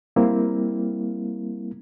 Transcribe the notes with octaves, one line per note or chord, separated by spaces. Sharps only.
G3 A#3 C4 E4